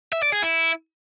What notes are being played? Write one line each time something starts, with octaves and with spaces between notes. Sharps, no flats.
E5
D5
G#4
E4